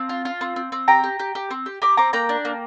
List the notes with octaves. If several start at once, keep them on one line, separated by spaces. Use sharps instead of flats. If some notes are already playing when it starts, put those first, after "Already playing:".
Already playing: C4 F5 A5
F4
F4
C4
C4
C4
G4 G5 A#5
G4
G4
G4
C4
G4
G4 A#5 D6
C4 A#5 D6
A#3 G5 A#5
D4
A#3